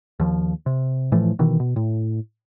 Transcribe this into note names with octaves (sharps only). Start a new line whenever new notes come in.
D#2 F3
C3
A2 E3 F3 A3
B2 D#3 E3
B2
A2